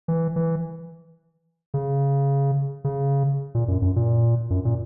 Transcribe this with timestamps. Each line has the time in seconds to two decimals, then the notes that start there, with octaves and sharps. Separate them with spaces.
0.08 E3
0.36 E3
1.74 C#3
2.84 C#3
3.55 A#2
3.68 F#2
3.82 F#2
3.96 A#2
4.50 F#2
4.65 A#2